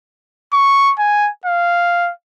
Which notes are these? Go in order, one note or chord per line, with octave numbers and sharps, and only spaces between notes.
C#6
G#5
F5